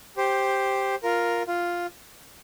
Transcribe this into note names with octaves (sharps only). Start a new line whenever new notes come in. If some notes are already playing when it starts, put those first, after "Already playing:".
G4 C5
F4 A#4
F4